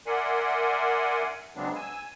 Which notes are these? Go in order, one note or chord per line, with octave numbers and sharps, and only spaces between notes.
A#4 D5 E5 F#5 G#5 C6
C#3 F#3 G#3 B3 C4 D4
G#5 E6